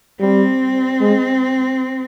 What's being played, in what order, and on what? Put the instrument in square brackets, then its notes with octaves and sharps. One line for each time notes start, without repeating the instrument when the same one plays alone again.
[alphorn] G3 [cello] C4
[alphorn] G#3